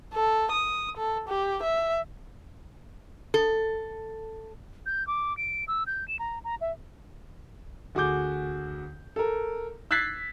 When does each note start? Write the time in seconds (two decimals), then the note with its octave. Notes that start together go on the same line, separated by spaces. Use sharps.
0.14 A4
0.52 D#6
0.97 A4
1.29 G4
1.63 E5
3.34 A4
4.86 G6
5.07 D6
5.37 D7
5.68 E6
5.87 G6
6.08 E7
6.19 A#5
6.44 A#5
6.61 E5
7.95 D2 F#4 G#4 D6 G6
9.16 A4 A#4
9.91 E6 F#6 G#6 A6 B6 C7